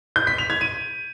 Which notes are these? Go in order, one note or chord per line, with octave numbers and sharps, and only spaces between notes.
G6
B6
F7
G#6
D#7